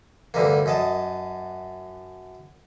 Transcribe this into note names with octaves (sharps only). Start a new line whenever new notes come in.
D2 G2 C3 A#3
F#2 D#5 A5